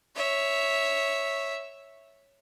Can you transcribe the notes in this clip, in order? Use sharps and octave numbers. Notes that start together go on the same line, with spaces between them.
C#5 E5